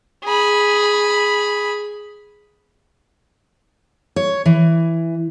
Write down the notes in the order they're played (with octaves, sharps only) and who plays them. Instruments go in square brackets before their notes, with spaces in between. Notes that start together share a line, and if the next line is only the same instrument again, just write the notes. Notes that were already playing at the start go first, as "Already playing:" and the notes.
[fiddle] G#4 B5
[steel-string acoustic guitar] C#5
E3